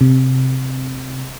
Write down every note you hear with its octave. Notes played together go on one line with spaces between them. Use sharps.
C3